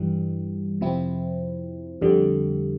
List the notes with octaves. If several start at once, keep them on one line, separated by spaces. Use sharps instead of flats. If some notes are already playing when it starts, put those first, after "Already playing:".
Already playing: G2 E3 G3
F2 C3 F3 C4 E4
F2 D3 G3